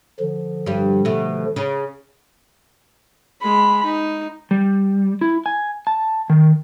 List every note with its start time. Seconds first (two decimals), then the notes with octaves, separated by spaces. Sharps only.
0.20 D3 F3
0.66 G2 G3
1.05 B2 A3
1.56 C#3
3.42 G#3 B5
3.85 D#4
4.51 G3
5.21 E4
5.46 G#5
5.87 A5
6.30 D#3